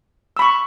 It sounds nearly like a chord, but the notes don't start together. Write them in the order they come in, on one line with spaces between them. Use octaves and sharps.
E6 B5 C#6